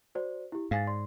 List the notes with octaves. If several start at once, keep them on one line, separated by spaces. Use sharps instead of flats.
F#4 C5 D5
E4 G4
G#2 F5 G#5 A6
D5 C6